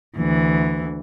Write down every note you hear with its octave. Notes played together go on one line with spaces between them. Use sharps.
D2 E3